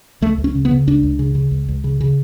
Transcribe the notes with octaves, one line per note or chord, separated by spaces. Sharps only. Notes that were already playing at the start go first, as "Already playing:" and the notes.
C#2 A3
C#2
C#4
C#3
B3
C#3
C#2 D4
C#2
C#3
C#3
C#2
C#2
C#3
C#3